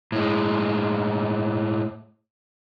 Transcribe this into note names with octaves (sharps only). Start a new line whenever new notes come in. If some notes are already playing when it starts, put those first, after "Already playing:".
A2 G#3